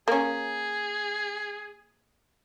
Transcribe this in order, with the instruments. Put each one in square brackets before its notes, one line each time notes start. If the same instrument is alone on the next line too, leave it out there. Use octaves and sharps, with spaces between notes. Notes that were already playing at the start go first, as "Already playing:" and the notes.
[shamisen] A#3 C#4 [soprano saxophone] G#4